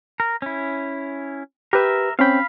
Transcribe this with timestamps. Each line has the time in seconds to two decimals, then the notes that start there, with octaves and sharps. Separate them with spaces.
0.20 A#4
0.42 C#4 E4
1.73 G4 A#4 B4 E5
2.19 C4 C#4 F5 G5 B5